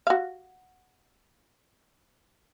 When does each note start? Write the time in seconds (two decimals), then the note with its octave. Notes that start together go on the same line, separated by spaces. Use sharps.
0.07 F#4 F5